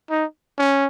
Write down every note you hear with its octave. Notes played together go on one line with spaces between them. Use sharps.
D#4
C#4